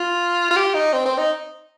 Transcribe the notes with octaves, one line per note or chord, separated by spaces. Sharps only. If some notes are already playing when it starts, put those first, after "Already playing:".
Already playing: F4
F4
G4
D#4
C4
C4
D#4